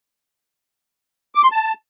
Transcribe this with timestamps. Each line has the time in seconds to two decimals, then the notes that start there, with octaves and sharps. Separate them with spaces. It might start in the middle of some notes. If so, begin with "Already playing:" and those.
1.35 D6
1.43 C6
1.51 A5